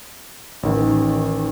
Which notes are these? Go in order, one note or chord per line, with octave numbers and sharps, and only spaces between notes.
A1 D#3